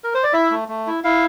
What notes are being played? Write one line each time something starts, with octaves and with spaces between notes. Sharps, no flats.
A#4
C5
D5
E4 E5
A3
A3
E4
E4 F5